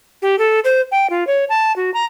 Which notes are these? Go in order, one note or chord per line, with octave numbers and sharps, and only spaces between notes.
G4
A4
C5
G5
F4
C#5
A5
F#4
A#5